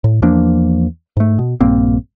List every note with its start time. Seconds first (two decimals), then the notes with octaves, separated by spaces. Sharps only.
0.04 A2
0.22 E2 F3 A#3 D4
1.17 G#2 A3
1.39 B2
1.61 A#1 G2 A#3 C4